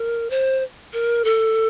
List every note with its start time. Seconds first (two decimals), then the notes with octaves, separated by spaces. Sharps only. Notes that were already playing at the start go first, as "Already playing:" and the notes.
Already playing: A#4
0.30 C5
0.93 A#4
1.25 A4